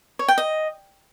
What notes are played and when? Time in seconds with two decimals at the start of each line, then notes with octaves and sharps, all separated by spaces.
0.19 C#5
0.28 G5
0.38 D#5